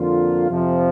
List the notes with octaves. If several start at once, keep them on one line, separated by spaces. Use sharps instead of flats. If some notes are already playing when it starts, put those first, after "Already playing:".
Already playing: F2 D3 A#3 F4
F2 C3 F3